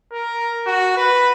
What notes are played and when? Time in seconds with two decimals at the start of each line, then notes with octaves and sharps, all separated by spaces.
0.13 A#4
0.67 F#4
0.97 B4